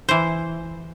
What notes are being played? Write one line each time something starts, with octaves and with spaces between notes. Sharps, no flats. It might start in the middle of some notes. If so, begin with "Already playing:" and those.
E3 C5